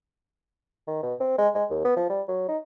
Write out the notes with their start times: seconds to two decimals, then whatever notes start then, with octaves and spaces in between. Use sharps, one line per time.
0.87 D#3
1.03 B2
1.20 C4
1.38 G#3
1.55 G#3
1.70 D#2
1.84 B3
1.97 F3
2.10 G3
2.28 F#3
2.48 D#4